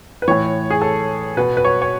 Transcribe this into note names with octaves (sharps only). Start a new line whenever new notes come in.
B4
A2 E3 C#5
G#4
A4
B2 B4
B4
C#5
C#5